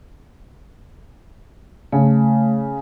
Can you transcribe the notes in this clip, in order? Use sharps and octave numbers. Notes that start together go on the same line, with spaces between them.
C#3 A3